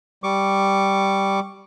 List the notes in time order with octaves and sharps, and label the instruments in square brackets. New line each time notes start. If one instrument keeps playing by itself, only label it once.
[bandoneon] G3 C#6 D6